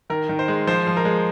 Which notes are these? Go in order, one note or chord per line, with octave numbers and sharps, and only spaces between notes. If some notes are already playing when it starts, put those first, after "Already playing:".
D#3 A#4
D#3
C5
G#3
F3 C5
F3
A#4
G#3